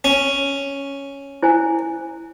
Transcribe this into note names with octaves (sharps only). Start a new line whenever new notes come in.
C#4
E4 C5 G#5